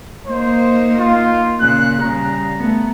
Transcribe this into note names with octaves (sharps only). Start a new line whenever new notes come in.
A#3 D#4 C5
F4
A#2 C#3 F#6
C#3 G3 A#5
A3 B3